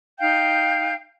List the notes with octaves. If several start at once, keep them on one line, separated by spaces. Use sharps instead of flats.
D#4 F5 G5 G6